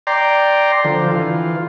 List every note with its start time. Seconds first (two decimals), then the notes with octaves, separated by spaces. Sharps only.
0.07 D5 G5 A#5 C6
0.84 D3 F3
1.12 E3 F4